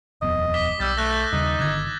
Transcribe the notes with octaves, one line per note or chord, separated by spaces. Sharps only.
D#1 F2 B3 D#5
D6 B6 G7
B1 G3 E6 G6 A6
A3 E6 F#6 A#6
D#2 C#3 G3 D#4
G1 D3 D#3 D6 F#6 G#6